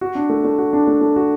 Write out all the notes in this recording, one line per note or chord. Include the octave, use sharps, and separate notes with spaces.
F#4
D4
A3
A3
F#4
D4
A3
A3
F#4